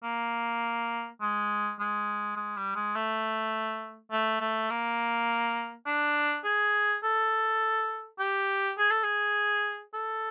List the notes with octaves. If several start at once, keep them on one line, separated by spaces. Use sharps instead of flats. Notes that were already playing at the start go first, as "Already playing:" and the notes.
A#3
G#3
G#3
G#3
G3
G#3
A3
A3
A3
A#3
D4
G#4
A4
G4
G#4
A4
G#4
A4